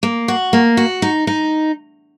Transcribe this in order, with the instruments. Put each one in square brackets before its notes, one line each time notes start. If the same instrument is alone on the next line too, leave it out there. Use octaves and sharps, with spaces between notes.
[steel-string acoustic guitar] A#3
F#4
A#3
F#4
D#4
D#4